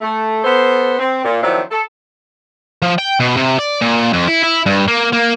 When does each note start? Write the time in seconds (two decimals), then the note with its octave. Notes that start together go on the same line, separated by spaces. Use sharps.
0.01 A3
0.44 B3 A4 C5
0.99 C4
1.25 A#2
1.43 D#3 F3 F#3 C4 D4 E4
1.71 A4
2.82 F3
2.99 G5
3.20 B2
3.37 C3
3.59 D5
3.82 A#2
4.13 F2
4.27 E4
4.43 E4
4.66 G2
4.88 A#3
5.13 A#3